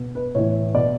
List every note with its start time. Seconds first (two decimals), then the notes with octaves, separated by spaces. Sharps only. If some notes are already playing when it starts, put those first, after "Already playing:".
Already playing: B2
0.15 B4
0.35 A2 E3 C#5
0.74 B2 D5